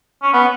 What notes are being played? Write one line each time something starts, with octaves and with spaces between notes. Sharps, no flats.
C#4
B3